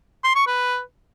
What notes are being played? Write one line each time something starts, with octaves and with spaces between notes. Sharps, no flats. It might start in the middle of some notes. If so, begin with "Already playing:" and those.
C6
C#6
B4